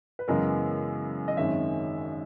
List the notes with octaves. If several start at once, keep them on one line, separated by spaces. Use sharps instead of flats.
B4
F#2 C#3 E3 G#3 B3 A#4
D#5
G#1 F#2 D#3 G#3 C#4 E5